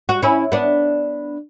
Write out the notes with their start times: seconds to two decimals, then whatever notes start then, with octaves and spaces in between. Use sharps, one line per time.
0.09 F#4
0.22 C#4 E4
0.52 B3 D4